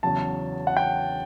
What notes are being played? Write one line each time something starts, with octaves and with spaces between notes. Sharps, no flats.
E2 C#3 F#3 A5
F#5
G5